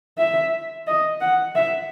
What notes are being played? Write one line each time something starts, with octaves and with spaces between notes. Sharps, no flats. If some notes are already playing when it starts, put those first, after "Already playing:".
E5
D#5
F#5
E5